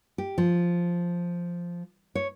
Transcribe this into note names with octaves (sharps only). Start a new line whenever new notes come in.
G4
F3
C#5